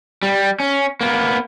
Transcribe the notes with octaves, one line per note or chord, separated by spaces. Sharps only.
G3
C#4
A#3 B3